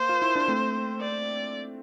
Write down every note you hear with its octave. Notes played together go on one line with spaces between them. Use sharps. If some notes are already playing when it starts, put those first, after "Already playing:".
Already playing: A#3 C5
F4
E4
D4
A3 C4
D5